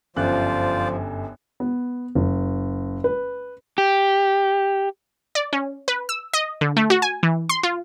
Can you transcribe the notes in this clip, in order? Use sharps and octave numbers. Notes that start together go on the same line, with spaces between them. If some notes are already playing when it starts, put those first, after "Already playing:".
G1 F#2 F3 F4 C5 D5 F#6
B3
F#1
B4
G4
D5
C#4
B4
E6
D#5
D3
A3
F#4
G#5
E3
C6
F4